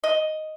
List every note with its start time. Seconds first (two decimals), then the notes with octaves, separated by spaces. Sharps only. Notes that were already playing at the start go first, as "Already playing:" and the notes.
0.04 D#5